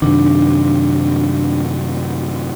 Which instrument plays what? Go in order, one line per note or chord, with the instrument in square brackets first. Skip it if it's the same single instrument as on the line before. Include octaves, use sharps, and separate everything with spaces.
[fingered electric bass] F#2 C3 D#3 [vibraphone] D4